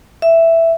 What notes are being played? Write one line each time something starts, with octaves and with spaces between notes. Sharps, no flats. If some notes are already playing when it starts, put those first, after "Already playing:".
E5